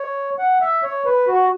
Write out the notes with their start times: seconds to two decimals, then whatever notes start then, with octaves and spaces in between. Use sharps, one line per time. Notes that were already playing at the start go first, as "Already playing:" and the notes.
Already playing: C#5
0.39 F#5
0.61 E5
0.83 C#5
1.05 B4
1.28 F#4